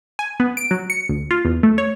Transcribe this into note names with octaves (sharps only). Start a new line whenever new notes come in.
G#5
B3
D7
F#3
C#7
D2
F4
E2
A3
C#5